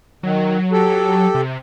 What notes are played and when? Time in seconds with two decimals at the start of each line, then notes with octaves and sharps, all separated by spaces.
0.23 D#3 F#3
0.72 G4 A4
1.35 C3